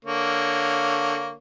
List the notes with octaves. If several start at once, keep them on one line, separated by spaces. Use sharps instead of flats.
D3 A#3 C#5